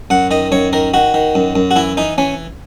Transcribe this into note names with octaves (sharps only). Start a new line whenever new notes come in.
F#2 F#5
D#3 D#5
F#2 C#5
D#3 A#4
D#3 F#4
D#3
F#2
F#2
F#4
E3 E4
E3 D#4
E3 C#4